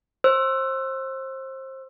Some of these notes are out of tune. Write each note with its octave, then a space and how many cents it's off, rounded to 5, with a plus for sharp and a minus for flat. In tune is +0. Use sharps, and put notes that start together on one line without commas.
C5 +25 E6 +15